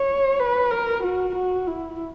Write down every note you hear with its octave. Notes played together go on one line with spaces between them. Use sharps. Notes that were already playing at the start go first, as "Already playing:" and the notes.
Already playing: C#5
B4
A#4
F#4
F#4
E4